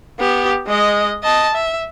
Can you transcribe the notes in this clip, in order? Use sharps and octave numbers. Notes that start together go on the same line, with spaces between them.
B3 G4
G#3 D#5
D#5 A5
E5